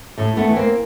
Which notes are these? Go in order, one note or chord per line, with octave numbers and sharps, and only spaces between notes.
A2 A3
A3 B3
E3
A#3 C4